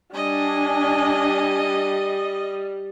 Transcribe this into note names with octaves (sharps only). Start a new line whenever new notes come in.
G3 D4 D#5 G#5